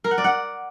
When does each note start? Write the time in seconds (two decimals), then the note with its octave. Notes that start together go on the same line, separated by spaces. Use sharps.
0.04 A#4
0.11 F#5
0.18 D5
0.24 F#5